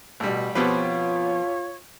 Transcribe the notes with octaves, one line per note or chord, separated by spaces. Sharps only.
A1 B2 G3
B2 F3 B3 C4 F4 G4 B4 C#5